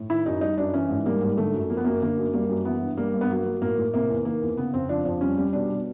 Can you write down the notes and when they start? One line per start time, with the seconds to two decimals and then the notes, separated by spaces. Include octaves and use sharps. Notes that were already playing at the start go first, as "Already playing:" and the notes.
Already playing: A2
0.09 D#3 E4
0.26 F#2 D#4
0.41 G3 D#4
0.57 F#2 D4
0.73 E3 C#4
0.89 G#2
1.06 G3 A#3
1.21 G#2
1.38 D3 A3
1.54 F#2
1.69 F3 A#3
1.77 B3
1.85 F#2 A#3
2.02 D3 A#3
2.17 F#2
2.33 G3 A#3
2.49 F#2
2.65 E3 B3
2.81 G2
2.97 G3 A#3
3.14 G2
3.21 B3
3.30 F#3 A#3
3.45 F#3
3.61 A2 A#3
3.78 A2
3.94 C3 A#3
4.10 E2
4.25 D#3 A#3
4.42 E2
4.57 C#3 B3
4.73 F2 C4
4.89 F3 D4
5.05 F2 D4
5.21 G3 C#4
5.38 G3
5.53 B2 D4
5.69 B2